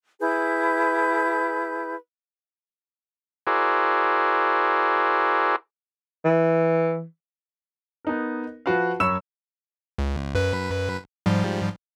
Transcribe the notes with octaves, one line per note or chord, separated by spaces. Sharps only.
E4 G#4 B4 G6
E4 F#4 G#4 A#4 C5 D5
E3
B3 D#4 A#4
F3 F4 F#4 B4 F5
F#2 C#5 B5 C#6 E6 E7
C#2
F#2 B4
G#2 F3 G3